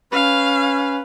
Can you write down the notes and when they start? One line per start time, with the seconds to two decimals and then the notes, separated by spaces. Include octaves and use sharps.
0.12 C#4 B4 F5